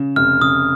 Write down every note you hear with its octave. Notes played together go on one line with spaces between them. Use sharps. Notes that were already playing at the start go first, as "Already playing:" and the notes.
Already playing: C#3
F1 F6
C#3 D#6